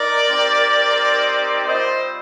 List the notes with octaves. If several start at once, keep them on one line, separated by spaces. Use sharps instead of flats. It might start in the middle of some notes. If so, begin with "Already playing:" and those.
Already playing: D#4 A#4 D5
C4 D#4 G4
G3 C4 F4 C5 D#5